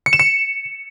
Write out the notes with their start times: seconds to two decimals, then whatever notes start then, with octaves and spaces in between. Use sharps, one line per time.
0.06 C#7
0.13 E7
0.20 C#7